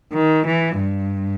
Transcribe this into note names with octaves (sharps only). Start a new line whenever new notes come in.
D#3
E3
G2